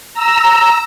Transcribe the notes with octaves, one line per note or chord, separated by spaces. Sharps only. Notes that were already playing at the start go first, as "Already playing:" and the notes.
A#5 E6